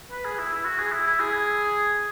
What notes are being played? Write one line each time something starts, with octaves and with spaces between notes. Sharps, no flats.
B4
G#4
E4
E4
F#4
G#4
E4
E4
G#4